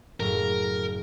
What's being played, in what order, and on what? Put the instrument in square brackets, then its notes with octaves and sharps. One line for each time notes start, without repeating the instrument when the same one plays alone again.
[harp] F#1 A2 [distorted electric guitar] A#4